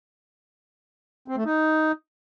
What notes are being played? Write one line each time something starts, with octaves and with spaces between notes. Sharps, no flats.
C4
A3
D#4